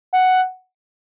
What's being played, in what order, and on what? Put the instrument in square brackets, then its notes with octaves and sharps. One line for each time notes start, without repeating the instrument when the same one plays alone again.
[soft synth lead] F#5